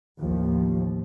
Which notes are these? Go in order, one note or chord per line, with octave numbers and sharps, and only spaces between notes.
A1 D#2 F3